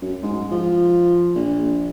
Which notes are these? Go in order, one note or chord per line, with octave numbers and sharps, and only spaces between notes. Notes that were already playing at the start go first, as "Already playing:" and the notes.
F#2
G#2
F3
A#1